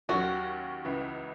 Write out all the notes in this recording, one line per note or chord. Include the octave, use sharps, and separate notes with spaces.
D#2 D#3 F#3 C#4 F#4
C#2 C#3 E3